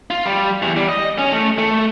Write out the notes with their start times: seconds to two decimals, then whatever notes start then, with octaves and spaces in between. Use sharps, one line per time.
0.10 F4
0.26 G3
0.62 E2
0.77 G3
0.89 D#5
1.19 C#4
1.32 A3
1.59 A3